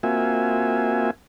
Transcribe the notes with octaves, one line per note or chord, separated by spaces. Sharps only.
A#3 C4 F4 F#4 E5 G#5